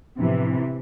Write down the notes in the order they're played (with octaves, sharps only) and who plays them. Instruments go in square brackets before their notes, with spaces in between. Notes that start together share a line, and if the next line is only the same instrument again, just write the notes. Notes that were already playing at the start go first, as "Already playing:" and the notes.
[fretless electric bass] A2 F3 B3 D4 [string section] C3 E3